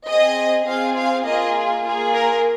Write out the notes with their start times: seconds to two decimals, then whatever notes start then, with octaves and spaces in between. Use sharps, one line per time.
0.08 C4 G#4 D#5
0.67 C4 F4 G#4 F5
0.97 F5
1.26 A#3 F4 G#4 D#5
1.85 A#3 F4 G#4
2.14 A#4